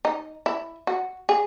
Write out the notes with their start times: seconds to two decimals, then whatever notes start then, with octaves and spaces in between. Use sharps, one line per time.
0.05 D#4
0.46 E4
0.87 F#4
1.29 G#4